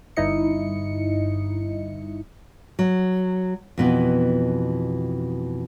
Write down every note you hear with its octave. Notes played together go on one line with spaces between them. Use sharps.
G1 G2 D#4 E4 D#5 C#7
F#3
F2 B2 E3